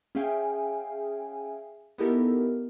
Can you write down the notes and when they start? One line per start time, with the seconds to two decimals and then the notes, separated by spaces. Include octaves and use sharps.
0.15 C#4 G#4 E5 F5 G5 G#5
1.98 B3 D#4 E4 G4 A4 A#4